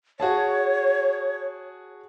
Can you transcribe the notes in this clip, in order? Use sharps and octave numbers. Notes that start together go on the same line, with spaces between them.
F#4 G#4 C#5 A5